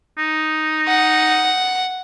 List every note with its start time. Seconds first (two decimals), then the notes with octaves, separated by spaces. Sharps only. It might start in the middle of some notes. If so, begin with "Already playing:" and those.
0.18 D#4
0.88 F#5